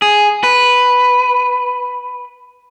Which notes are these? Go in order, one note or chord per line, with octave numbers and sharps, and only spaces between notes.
G#4
B4